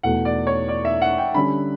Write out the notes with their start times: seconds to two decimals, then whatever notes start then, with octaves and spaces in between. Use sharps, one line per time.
0.03 E2 B2 A3 F#5
0.25 D5
0.47 C#5
0.68 D5
0.85 E5
1.02 F#5
1.18 G5
1.34 D3 G3 C#4 G4 B5